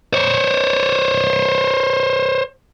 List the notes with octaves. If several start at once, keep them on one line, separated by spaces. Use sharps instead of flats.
C5 C#5